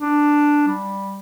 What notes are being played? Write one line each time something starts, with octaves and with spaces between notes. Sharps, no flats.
D4
G3